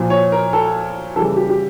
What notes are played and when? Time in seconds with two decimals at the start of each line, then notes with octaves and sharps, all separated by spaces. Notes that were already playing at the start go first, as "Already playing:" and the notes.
Already playing: A#2 F3
0.10 C#5
0.32 A#4
0.53 A4
1.16 C#3 E3 G3 A4
1.37 G4
1.49 G4